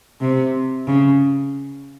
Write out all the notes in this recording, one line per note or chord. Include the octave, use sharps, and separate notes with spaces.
C3
C#3